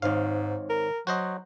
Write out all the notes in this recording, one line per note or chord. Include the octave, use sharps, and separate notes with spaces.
G#1 G#2 D#4 C5 C#5 F5
A#4
F#3 F#4 C5 D#5